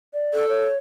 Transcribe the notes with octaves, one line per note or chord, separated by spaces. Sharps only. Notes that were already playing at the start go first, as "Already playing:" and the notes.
D5
A4
C#5